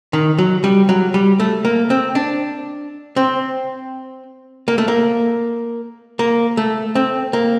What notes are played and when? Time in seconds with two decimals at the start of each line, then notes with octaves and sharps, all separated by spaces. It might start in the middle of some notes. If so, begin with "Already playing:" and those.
0.13 D#3
0.38 F#3
0.64 G3
0.89 F#3
1.14 G3
1.40 A3
1.65 A#3
1.90 C4
2.15 D4
3.16 C4
4.68 A#3
4.78 A3
4.88 A#3
6.19 A#3
6.57 A3
6.95 C4
7.33 A#3